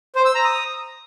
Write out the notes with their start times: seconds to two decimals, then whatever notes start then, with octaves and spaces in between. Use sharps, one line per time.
0.15 C5
0.25 E6
0.35 A#5
0.45 D#6